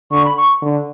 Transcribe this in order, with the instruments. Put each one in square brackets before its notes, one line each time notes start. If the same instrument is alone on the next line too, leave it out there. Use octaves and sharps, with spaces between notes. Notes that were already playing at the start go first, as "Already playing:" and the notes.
[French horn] D3 [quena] C#6
[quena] B5
C#6
[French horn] D3